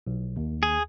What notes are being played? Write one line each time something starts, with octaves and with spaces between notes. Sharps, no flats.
B1
D#2
G#4